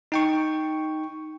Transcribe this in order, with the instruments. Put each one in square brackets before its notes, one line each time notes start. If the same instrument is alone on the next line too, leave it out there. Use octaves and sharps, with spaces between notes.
[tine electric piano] D#4 G5 C#6